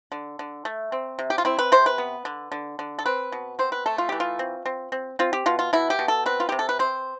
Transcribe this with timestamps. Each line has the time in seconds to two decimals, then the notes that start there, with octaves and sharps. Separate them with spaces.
0.12 D3
0.39 D3
0.65 A3
0.92 C4
1.19 C3
1.30 G4
1.38 F4
1.45 C4 E4
1.59 B4
1.72 C3 C5
1.86 B4
1.98 B3
2.25 D3
2.52 D3
2.79 D3
2.99 A4
3.06 C4 B4
3.32 B2
3.59 C4 C5
3.72 B4
3.86 A3 A4
3.98 F4
4.09 E3 G4
4.20 F4
4.39 C4
4.66 C4
4.92 C4
5.19 C4 F4
5.33 G4
5.46 B2 F4
5.59 F4
5.73 B2 E4
5.90 G4
5.99 B2
6.08 A4
6.26 C4 B4
6.40 F4
6.49 C3 G4
6.59 A4
6.69 B4
6.79 C4 C5